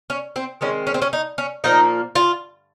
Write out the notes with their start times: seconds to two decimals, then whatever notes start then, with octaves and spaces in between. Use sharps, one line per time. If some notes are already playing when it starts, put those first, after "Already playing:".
0.10 C#4
0.36 C4
0.61 D#3 G#3 C4 C#4
0.87 C#4
0.94 C4
1.02 C#4
1.13 D#4
1.38 C#4
1.64 A#2 F3 A#3 D#4
2.15 F4